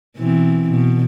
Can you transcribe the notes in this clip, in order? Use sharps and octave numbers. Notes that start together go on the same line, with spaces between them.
B2 E3 C4
B2